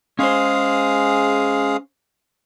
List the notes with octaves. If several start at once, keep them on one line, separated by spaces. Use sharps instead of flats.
G#3 C#4 G#4 C5 F5